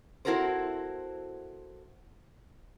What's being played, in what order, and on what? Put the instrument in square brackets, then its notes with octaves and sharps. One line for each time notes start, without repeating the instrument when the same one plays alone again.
[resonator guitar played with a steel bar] C4 E4 F#4 A4 A#4 C5